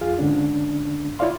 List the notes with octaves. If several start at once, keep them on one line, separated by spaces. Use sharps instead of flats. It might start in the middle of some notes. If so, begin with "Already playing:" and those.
F2 F4 G#4 F5
G#2 D3 C#4 D4
E4 F4 C#5 D5 F5 C6